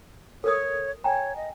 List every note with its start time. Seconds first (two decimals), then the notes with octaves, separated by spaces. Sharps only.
0.44 A4 A#4 C#5 D#6
1.04 C#5 G5 G#5 A#5
1.36 D#5